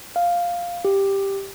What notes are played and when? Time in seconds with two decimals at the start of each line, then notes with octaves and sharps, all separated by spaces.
0.16 F5
0.85 G4